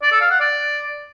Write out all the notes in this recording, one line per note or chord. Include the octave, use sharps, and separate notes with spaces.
D5
A4
F5
F#5
D5